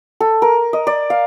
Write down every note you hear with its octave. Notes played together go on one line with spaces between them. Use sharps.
A4
A#4
D#5
D5
F5